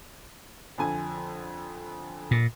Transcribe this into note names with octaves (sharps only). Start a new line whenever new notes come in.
F2 D3 G#5
A#2